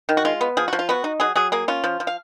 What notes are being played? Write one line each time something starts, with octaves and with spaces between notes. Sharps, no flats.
D#3
F#4
G#3 F4
B3
F3 G#4
F3 F#4
F4
B3 F#4
D#4
F#3 G#4
F#3 G#4
A#3 G#4
C#4 F4
F3
F3
F5